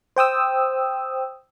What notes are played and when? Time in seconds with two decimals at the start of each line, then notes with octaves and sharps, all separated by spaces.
0.16 C5 G5 D#6 E6